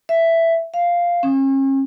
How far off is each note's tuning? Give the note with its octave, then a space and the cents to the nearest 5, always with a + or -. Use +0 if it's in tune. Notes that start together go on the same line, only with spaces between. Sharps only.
E5 +5
F5 -5
C#4 -40